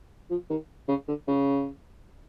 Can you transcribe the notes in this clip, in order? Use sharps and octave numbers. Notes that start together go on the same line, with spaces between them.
F3
D#3
C#3
D3
C#3